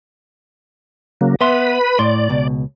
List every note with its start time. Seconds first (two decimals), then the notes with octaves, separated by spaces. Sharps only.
1.21 C#3 F#3 A#3
1.41 B3 B4 E5 B5 C6
1.99 A2 D5 C6
2.29 C#2 B2